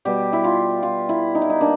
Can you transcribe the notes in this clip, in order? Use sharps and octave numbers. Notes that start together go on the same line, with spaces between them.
B2 G3 B3 G4
E4
F4
F4
E4
D#4
E4
D#4
A#3 D4